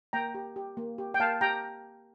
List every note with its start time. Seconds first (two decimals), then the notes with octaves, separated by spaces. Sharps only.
0.13 A#3 G5 A#5
0.35 G4
0.56 G4
0.77 A#3
0.98 G4
1.14 G5
1.20 A#3 F5 A5
1.41 G4 G5 A#5